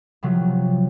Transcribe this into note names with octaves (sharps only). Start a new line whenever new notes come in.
C3 F3 F#3